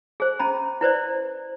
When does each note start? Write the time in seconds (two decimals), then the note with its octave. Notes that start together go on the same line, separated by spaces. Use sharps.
0.20 G#4 C5
0.39 C#4 A#5 B5
0.81 E4 B4 C5 D5